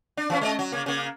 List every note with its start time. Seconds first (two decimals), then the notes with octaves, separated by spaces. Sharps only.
0.17 D4
0.30 E3 G#3 C#4
0.41 G#3 D5 D#5
0.59 F#3
0.72 C#3 A#3
0.86 C#3 A#3